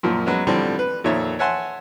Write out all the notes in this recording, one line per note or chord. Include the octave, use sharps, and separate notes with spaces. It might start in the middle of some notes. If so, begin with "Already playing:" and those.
F#2 A#2 F3
F#3 G#3 B3 C#4
A2 D3 F3 G3 C4
B4
F2 A#2 D#3 C#5 E5
C#5 E5 F#5 G#5 A5 C6